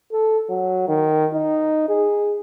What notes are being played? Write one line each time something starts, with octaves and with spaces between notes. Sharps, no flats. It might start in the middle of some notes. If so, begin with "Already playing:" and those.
A4
F#3
D#3
D#4
G#4